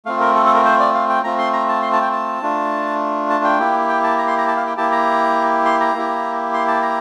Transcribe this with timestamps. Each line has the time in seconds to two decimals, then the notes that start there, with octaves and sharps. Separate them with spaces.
0.05 A3 C4 F4 F5
0.20 A#4
0.35 A4
0.46 A4
0.55 A#4
0.65 C5
0.80 D5
0.94 F5
1.09 G5
1.24 A3 C4 F4 A#5
1.38 C6
1.53 A#5
1.69 A5
1.82 C6
1.93 A5
2.02 G5
2.12 A5
2.42 A3 D4 F4
3.30 A5
3.44 G5
3.59 A#3 E4 G4
3.89 G5
4.04 A5
4.18 A#5
4.27 C6
4.38 A#5
4.48 A5
4.57 F5
4.67 G5
4.77 A#3 E4 G4 A5
4.92 A#5
5.65 C6
5.80 A#5
5.95 A#3 E4 G4
6.53 C6
6.68 A5
6.83 A#5